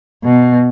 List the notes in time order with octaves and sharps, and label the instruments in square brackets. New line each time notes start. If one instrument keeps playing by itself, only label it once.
[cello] B2